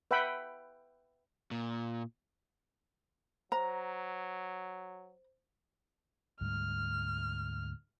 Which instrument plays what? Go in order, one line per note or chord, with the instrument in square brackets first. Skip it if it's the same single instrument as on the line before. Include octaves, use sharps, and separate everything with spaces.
[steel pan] B4 E5 F#5 G5 B5
[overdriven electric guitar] A#2
[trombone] F#3 [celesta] C5 [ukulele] A#5
[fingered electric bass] D2 G#2 G3 [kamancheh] F6